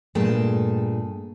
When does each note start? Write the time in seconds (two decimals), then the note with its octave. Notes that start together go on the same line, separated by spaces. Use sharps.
0.15 G2 A#2 A3 G#4 G5 A5